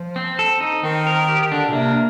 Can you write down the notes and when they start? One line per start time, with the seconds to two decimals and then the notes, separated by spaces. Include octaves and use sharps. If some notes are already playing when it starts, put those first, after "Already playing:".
Already playing: F3
0.16 C4
0.39 A4
0.61 D#4
0.83 D#3 C4
1.07 A#4
1.28 G4
1.52 D3 D4
1.69 A#2
1.73 C3 A#3